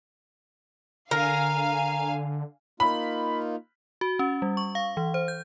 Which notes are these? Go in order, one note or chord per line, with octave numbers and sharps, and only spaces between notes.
D3 A#4 F5 G#5
A#3 D#4 F4 B5
F#4
C#4
G3
C#6
F5
E3
C5
G6